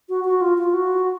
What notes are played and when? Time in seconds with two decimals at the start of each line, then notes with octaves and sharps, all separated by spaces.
0.09 F#4
0.25 F#4
0.41 F4
0.58 F4
0.74 F#4